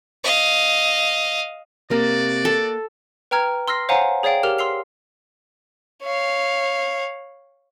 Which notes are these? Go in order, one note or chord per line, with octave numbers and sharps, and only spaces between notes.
D#5 F5
C3 A#3 F#4 D5
A4
B4 G5 A#5 F6 G#6
C6 E6 F6 A#6 C7
C5 C#5 F5 F#5 G#5 A#5
G#4 C#5 D5 F5 G5
G4 A#4 F6 F7
C6 E6 C7 F7
C#5 F5